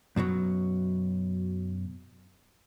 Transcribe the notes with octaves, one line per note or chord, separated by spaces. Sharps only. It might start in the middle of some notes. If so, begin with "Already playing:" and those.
F#2 B2 D3 F#3